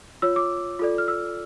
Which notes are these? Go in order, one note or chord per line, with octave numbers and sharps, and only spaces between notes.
F4 C#5 E6
D6
F4 A4 D5
F6
E6